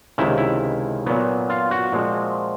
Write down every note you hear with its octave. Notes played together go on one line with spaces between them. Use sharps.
C#2 C3 D#3 E4
E4
A#2 F#3 B3
F4
F#4
A#2 F3 G#3 C4